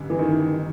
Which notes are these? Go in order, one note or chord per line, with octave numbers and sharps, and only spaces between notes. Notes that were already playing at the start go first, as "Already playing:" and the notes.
Already playing: A1 G2 D3
E3
D#3